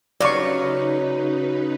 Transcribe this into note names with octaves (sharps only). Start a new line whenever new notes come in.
C#3 F#3 D#4 B4 D5 F5 C#6